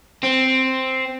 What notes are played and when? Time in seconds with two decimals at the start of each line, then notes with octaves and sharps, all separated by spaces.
0.23 C4